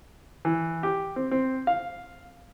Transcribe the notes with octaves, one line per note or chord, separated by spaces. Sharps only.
E3
G4
C4
C4
F5